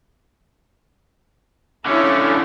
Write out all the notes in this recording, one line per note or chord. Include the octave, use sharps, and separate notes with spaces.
D3 C#4 E4 A4